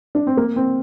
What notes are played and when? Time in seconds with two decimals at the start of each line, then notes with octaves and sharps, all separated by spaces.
0.15 D4
0.27 C4
0.37 A#3
0.56 C4